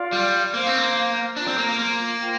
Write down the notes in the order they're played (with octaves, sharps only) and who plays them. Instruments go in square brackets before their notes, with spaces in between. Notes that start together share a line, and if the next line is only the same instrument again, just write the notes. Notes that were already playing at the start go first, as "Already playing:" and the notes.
Already playing: [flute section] F4 D5 F5
[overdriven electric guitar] G3
[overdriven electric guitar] A#3 [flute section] C5 F5 C6
[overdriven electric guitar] C4
A#3
[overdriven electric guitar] D4 [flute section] F4 C5 A#5
[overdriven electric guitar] C4
A#3
A#3
A#3
[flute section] F4 C5 G5